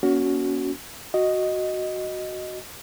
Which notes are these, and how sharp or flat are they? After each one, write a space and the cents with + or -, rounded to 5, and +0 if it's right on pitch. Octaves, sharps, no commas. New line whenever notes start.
A#3 +45 C#4 +30 F#4 +0
F#4 +0 D#5 +0